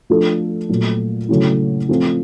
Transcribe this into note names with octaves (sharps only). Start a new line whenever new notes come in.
F3 A3 D4 F4 A4
A#2 F#3 A3
C#3 F#3 A3 C#4 E4
F3 A3 C4 F4 A4